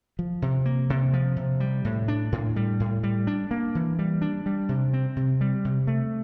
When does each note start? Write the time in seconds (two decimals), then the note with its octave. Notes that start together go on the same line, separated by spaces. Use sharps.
0.19 F3
0.42 C3
0.66 A#3
0.90 C3
1.13 F3
1.37 C3
1.60 G3
1.85 A2
2.08 D4
2.32 A2
2.56 G3
2.80 A2
3.03 G3
3.27 D4
3.51 A#3
3.75 E3
3.99 G3
4.21 D4
4.46 G3
4.69 C3
4.93 C4
5.16 C3
5.41 G3
5.65 C3
5.87 A3